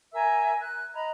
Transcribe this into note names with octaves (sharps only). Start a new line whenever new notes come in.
A#4 E5 G#5 E6
F#6
D#5 A#5 B5